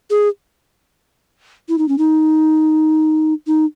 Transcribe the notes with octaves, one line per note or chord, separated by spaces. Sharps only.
G#4
E4
D#4
C#4
D#4
D#4